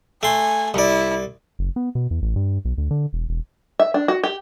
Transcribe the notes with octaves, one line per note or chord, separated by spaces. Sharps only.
A3 G#5 C6
C2 E4 D5
F#1
B3
B2
E2
A1
G2
B1
D2
D3
E1
E1
E5
D4
F#4
G4